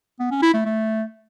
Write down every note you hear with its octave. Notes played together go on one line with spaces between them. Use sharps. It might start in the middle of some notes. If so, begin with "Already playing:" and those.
B3
C#4
E4
A3
A3